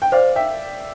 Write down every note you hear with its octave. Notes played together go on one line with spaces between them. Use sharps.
G5
C5 D5 F5
E5 G5